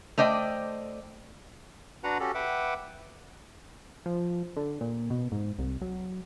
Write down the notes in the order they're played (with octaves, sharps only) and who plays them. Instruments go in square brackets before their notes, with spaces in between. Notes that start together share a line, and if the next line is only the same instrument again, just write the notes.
[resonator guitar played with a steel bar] A3 C5 D5 D#5 G5
[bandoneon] D4 F#4 B4 F#5 A#5
C#4 F#4 G4 A4
B4 E5 F#5 G5 D6
[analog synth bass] F3
D3
A#2
B2
G#2
C2
F#3